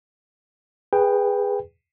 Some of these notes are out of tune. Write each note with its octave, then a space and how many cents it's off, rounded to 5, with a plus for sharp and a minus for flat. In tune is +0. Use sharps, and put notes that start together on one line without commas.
G#4 -15 B4 +0 G5 +10